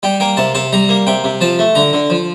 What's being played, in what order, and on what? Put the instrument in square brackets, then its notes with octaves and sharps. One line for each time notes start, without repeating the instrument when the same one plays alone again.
[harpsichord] G3 G5
A#3 G5
C3 A5
C3 A5
G3 A#5
A#3
C3 G5
C3
F3 A5
A3
D3 A#5
D3
F3